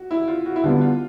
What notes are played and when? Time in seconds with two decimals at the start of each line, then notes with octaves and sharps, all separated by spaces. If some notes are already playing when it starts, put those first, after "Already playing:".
Already playing: F#4
0.11 E4
0.28 F4
0.46 F#4
0.56 E4
0.64 D3 G3 B3 F4
0.81 F4